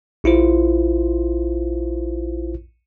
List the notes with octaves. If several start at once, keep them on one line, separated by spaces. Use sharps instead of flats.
A#1 E4 F4 C5